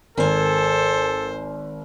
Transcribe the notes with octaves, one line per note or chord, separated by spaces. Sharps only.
G#1 A4 A#4 C5 G#5